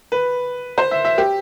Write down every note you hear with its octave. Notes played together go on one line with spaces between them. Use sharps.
B4
C5
E5
E5
G4